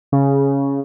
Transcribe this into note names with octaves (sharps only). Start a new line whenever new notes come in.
C#3